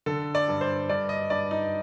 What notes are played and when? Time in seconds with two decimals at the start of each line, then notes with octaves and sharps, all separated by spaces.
0.06 D3 A4
0.35 D5
0.48 G2
0.61 C5
0.89 G2 D5
1.09 D#5
1.30 G2 D5
1.51 D#4